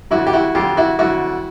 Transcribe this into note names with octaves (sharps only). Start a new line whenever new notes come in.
F2 D3 F#3 E4 F#4
G4
E4 F#4
F2 D3 F#3 F4 G4
E4 F#4
F2 D3 F#3 E4 F#4